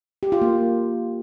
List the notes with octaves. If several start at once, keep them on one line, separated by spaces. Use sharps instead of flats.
G4
F4
A#3